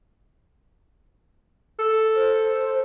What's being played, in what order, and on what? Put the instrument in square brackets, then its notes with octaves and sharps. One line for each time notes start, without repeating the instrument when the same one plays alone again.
[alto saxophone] A4
[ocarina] C5